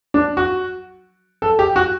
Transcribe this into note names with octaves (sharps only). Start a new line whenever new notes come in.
D4
F#4
A4
G4
F#4